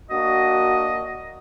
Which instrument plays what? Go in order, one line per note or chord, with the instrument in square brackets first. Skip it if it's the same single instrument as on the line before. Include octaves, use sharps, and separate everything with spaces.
[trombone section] A#3 D4 F#4 [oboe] D#5